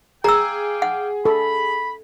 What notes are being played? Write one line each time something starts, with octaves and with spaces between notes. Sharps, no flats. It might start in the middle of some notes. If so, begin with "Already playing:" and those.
G#4 F5 G5 A#5 D6 E6
F#5
A4 B5